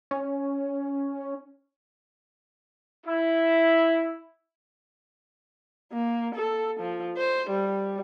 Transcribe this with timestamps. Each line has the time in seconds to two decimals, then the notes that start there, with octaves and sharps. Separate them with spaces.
0.11 C#4
3.07 E4
5.93 A#3
6.35 A4
6.80 F3
7.17 C5
7.50 G3